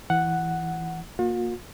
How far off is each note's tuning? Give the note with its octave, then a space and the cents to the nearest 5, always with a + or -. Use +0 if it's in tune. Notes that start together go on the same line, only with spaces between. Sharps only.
E3 +0 F#5 +0
A#3 +0 F4 +45